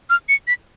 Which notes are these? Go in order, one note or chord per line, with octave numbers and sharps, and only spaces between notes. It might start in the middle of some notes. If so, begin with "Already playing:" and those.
F6
C#7
B6